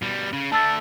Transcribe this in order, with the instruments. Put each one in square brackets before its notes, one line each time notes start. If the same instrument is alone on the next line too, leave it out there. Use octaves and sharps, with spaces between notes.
[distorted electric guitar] B2 G3
C#3
[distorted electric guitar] A3 D4 [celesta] A5 E6 A6